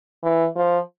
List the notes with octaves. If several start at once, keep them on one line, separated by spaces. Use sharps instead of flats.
E3
F3